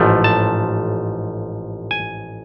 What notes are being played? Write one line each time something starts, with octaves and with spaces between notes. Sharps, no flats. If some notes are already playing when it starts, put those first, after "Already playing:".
Already playing: A1 G#2 F3 A3
A5
G#5